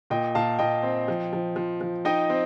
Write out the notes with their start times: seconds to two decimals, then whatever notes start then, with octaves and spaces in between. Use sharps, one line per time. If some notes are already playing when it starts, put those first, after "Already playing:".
0.10 A#2 D#5 G5
0.35 A#2 F5 A5
0.59 A#2 D#5 G5
0.83 C4
1.08 F3
1.33 F3
1.56 F3
1.81 F3
2.05 D#4 D#5 G5
2.30 C4